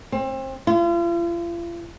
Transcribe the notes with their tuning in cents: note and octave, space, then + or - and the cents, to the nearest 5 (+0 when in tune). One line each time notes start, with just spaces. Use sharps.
C4 +30
F4 -40